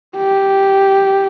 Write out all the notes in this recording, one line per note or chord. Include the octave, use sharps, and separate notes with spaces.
G4